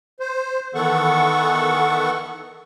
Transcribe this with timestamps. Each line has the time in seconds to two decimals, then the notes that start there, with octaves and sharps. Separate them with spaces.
0.20 C5
0.75 D#3 E3 B3 A4 F#5 C#6